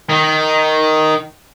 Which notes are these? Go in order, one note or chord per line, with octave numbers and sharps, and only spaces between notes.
D#3